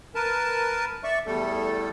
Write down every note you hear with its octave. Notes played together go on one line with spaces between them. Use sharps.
A#4 B4 A5
D5 E5 C#6
E2 G3 A3 A4